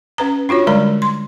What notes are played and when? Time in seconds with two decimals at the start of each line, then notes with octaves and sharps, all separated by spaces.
0.18 C#4 B4 A#5
0.49 D4 F4 F#4 C#5
0.67 D3 G3 G#3 D5 A#5
1.02 C6